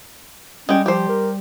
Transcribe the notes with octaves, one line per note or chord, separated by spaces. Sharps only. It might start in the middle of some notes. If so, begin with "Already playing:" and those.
G3 G#3 C#4 G5
F3 G4 C5
A#4